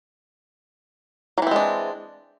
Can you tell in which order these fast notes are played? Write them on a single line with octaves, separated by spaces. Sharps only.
F#3 E3 C4 G#3 D4